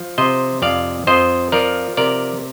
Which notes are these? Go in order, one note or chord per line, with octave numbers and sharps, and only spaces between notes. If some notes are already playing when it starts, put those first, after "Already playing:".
Already playing: F3
C3 C5 D#5
F2 D5 F5
F2 C5 D#5
F3 A#4 D5
C3 A#4 D5